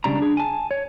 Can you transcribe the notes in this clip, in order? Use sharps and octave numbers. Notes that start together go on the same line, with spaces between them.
C#2 C#3 G3 D4 A#5
D4 G#4
G#5 A5
C#5